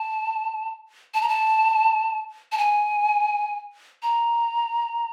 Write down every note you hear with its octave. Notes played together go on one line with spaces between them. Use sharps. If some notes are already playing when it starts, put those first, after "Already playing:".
Already playing: A5
A5
A#5
A5
A5
G#5
A#5